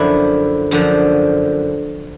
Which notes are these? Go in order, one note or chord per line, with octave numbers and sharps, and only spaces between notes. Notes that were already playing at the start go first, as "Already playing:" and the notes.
Already playing: F#2 D3 F3 E4
F#2 D3 F3